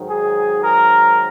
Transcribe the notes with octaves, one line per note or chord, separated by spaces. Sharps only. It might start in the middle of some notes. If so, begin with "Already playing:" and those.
Already playing: G#2 D#3 F#3
G#4
A#4